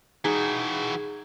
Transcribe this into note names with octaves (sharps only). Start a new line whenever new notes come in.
E3 D#4 F#4 G#4